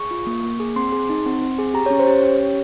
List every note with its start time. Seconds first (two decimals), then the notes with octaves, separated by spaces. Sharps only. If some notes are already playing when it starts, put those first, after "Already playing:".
Already playing: G#4 C#6
0.11 F4
0.27 A#3
0.43 A#3
0.60 G#4
0.76 C4 C6
0.93 G#4
1.09 D#4
1.26 C4
1.42 C4
1.59 G#4
1.74 G4 A#5
1.86 C#4 C#5
1.99 C5
2.07 G4 C#5
2.23 C#4
2.40 G4